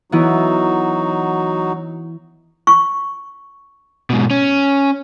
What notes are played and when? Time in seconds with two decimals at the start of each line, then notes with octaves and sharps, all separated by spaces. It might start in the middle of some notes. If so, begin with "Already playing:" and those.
0.12 E3 F#3 B3 D#4 E4 F#4
2.67 C#6
4.10 G#2 B2
4.31 C#4